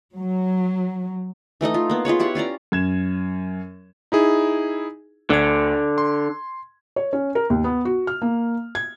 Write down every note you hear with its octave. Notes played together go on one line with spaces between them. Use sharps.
F#3
E3 A3 D#4 D#5
F4
A#3 B3
F4 G#4 B4 C#5
E4 G4 C#5 F#5
C#4 F4 D5 A#5
F#2 G#6 E7
D#4 E4 G#4
D2 D3 G#6
C6
C#5
C#4
A#4
D#2
B3
F#4
F6
A#3
G#6